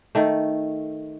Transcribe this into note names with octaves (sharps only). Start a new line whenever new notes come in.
D#3 A3